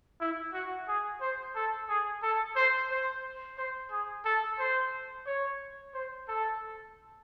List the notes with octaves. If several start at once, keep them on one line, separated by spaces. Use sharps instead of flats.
E4
F#4
G#4
C5
A4
G#4
A4
C5
C5
C5
G#4
A4
C5
C#5
C5
A4